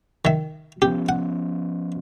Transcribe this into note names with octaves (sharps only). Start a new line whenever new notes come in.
D#3 E5
F3 B3 C#4 G4
F#5